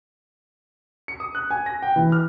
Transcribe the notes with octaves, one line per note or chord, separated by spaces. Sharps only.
C#7
D#6
F#6
G#5
A#6
G5
E3
F6